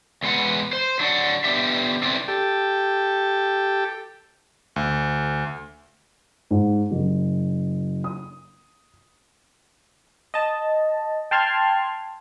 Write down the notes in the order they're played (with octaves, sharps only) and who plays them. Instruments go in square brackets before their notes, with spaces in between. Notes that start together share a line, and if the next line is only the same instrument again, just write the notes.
[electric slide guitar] E2 G#3 B4 F#5
C5
F#3 D4 D5 F#5
B3 D4 G4 E5
C4 E4 A4 B4 D5
[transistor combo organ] G4 A4
[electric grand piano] D2
[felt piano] G#2
F#1
D#6
[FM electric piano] D#5 A5
G5 A5 C6 F6 G6 G#6